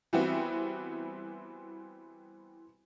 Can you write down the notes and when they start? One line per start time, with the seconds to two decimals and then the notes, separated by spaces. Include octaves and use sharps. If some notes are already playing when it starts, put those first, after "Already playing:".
0.13 E3 G3 B3 C4 E4 F#4